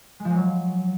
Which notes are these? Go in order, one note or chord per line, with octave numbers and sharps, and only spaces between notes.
G#3
F3
G#3
F#3